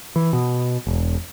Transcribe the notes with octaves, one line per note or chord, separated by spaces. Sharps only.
E3
B2
E1